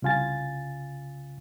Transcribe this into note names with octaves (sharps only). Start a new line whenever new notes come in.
C2 C#3 F4 G#5 A6